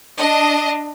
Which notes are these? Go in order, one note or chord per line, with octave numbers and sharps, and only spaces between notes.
D4 D#5